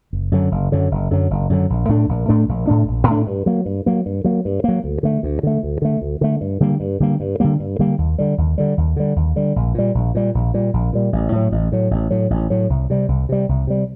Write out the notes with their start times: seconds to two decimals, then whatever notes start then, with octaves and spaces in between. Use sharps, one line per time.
0.13 F#1
0.32 F#2 D3 F#3
0.51 F#1
0.72 F#2 D3 F#3
0.91 F#1
1.11 F#2 D3 F#3
1.30 F#1
1.50 F#2 D3 F#3
1.70 A#1
1.89 A2 A3 D4
2.09 A#1
2.29 A2 A3 D4
2.49 A#1
2.67 A2 A3 D4
2.88 A#1
3.07 A2 A3 D4
3.27 G2
3.46 F#3 A#3
3.65 G2
3.86 F#3 A#3
4.06 G2
4.24 F#3 A#3
4.45 G2
4.64 F#3 A#3
4.84 D2
5.03 D3 A3
5.23 D2
5.43 D3 A3
5.63 D2
5.82 D3 A3
6.02 D2
6.21 D3 A3
6.41 G2
6.60 D3 G3 A#3
6.80 G2
7.00 D3 G3 A#3
7.20 G2
7.40 D3 G3 A#3
7.60 G2
7.79 D3 G3 A#3
7.98 D#2
8.18 D3 G3
8.38 D#2
8.58 D3 G3
8.77 D#2
8.96 D3 G3
9.16 D#2
9.36 D3 G3
9.56 A#1
9.74 A#2 G3
9.95 A#1
10.15 A#2 G3
10.35 A#1
10.54 A#2 G3
10.73 A#1
10.93 A#2 G3
11.13 A1
11.32 A2 F#3
11.52 A1
11.72 A2 F#3
11.91 A1
12.10 A2 F#3
12.30 A1
12.50 A2 F#3
12.70 C2
12.90 C3 G3
13.08 C2
13.29 C3 G3
13.49 C2
13.67 C3 G3